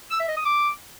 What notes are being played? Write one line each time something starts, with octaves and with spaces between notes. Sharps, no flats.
E6
E5
D#5
D#6
D6